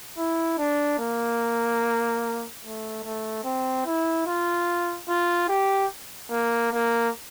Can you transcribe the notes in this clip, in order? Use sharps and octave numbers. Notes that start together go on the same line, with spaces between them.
E4
D4
A#3
A3
A3
C4
E4
F4
F4
G4
A#3
A#3